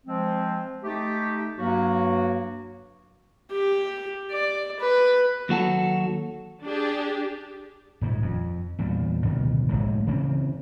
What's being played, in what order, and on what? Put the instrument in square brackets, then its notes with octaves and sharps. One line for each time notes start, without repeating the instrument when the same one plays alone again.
[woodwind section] F3 G#3 C4
A3 D#4 G4
G2 F#3 A#3 F#4
[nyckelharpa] G4
D5
B4
[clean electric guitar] D#2 F#3 F#4 A4
[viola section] D4 G4 G#4
[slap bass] D#1 G#2
F2
E2 A#2 G3
D1 B2 D#3
F1 C2 A2 G#3
C#3 E3 F#3 C4